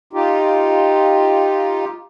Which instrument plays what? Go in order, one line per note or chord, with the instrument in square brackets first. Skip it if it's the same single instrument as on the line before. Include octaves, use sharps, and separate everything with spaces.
[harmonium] D#4 F4 G4